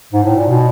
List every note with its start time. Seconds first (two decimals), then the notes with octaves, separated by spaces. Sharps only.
0.12 G#2
0.24 A2
0.34 A#2
0.47 B2